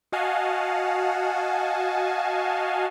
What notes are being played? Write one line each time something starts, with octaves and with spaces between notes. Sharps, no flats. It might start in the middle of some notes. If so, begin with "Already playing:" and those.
F#4 D#5 F5 F#5 G#5 A5